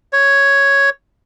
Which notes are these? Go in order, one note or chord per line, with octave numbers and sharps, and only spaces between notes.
C#5